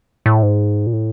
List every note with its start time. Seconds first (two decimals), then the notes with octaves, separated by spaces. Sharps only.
0.26 A2
0.43 G#2
0.87 A#2
0.93 A2